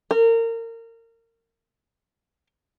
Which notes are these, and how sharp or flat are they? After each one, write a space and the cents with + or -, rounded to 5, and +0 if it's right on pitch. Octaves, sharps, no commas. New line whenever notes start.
A#4 -30